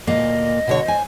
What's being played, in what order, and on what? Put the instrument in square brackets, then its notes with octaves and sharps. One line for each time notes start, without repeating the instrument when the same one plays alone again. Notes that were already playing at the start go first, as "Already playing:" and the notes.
[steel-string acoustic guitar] D2 A#2 A#3 [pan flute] D#5
[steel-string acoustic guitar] B2 D3 C#5
C5 G#5